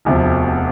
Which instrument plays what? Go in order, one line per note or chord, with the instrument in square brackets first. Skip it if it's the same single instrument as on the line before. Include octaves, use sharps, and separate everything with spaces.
[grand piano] E1 D2 C3 F3